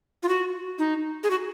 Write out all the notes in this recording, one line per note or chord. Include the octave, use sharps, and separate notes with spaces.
F4
F#4
D#4
G#4
F#4